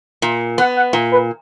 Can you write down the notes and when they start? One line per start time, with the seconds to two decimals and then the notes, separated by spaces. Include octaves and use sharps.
0.22 A#2
0.58 B3 F#5
0.76 F#5
0.93 A#2
1.12 B4